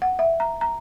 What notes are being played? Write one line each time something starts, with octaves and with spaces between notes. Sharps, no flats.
F#5
E5
A#5
A#5